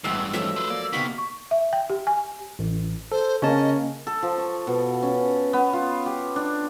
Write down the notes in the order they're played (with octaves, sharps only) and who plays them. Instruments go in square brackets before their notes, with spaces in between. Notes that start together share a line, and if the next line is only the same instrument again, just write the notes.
[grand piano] A1 F#5 C7 [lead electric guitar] D2 G2 [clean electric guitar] E3 G#3 [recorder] E6
[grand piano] F3 F#3 A3 [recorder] E6
[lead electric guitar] B4 C5
[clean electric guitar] A#3 [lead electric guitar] D5
[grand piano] C3 D#4 [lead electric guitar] A#3 [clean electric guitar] B3 F#4 [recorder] B6
[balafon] C#6
E5
G5
G4
G#5
[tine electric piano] A1
[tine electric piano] A4 [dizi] C5
[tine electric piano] C#3 A5 [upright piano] A#3 C#4 [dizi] D#5
[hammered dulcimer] A4
F3
C#6
B2
C#4
B3
F4
G4
D4